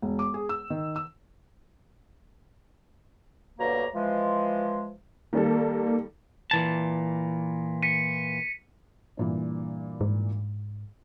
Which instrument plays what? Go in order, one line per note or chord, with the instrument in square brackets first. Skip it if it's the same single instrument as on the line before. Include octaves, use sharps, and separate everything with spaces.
[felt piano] E1
D6
G#4
E6
D#3
E6
[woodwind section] D2 G2 B2 F#3 A#3 A#5
E3 F3 G#3
[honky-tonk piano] D#3 G3 A4 [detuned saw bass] A#3
[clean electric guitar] A#2 E3 A5
[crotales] B6 C#7 D#7
[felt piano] G2 A#2 E3
[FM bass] G#2